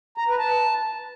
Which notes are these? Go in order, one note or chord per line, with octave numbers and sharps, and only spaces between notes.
A#5
B4
A5